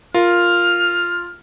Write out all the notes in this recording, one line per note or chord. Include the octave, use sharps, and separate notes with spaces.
F4 A#4 F6